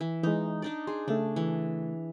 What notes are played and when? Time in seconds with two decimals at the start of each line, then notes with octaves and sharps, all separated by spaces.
0.01 E3
0.23 E3 G#3 D#4
0.62 D4 D#4 D5
0.87 G#4 C6
1.08 C#3 A3 D4
1.36 E3